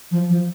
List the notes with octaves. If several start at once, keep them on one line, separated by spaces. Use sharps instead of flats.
F3
F3